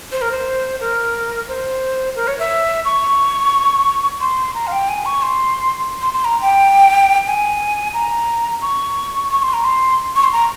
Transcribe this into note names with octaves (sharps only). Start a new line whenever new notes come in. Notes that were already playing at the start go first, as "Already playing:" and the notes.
C5
A#4
C5
A#4
C5
A#4
C#5
E5
C#6
C6
A#5
F5
G5
G#5
C#6
C6
C6
C6
A#5
G5
G#5
A#5
C#6
C#6
C6
A#5
C6
C#6
C6
A#5